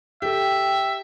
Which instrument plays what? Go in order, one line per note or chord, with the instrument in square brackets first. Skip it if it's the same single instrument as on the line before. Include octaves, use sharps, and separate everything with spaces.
[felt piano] G4 A4 [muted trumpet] E5 [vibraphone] G5